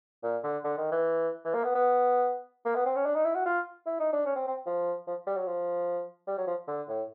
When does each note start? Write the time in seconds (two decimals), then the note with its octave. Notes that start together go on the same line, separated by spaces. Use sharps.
0.23 A#2
0.44 D3
0.64 D3
0.78 D#3
0.92 E3
1.45 E3
1.54 A#3
1.64 B3
1.75 B3
2.65 A#3
2.76 B3
2.86 C4
2.96 C#4
3.06 D4
3.15 D#4
3.25 E4
3.35 F#4
3.46 F4
3.86 E4
4.00 D#4
4.13 D4
4.26 C#4
4.36 C4
4.47 C4
4.66 F3
5.07 F3
5.27 G3
5.37 F#3
5.46 F3
6.27 G3
6.38 F#3
6.47 F3
6.68 D3
6.88 A2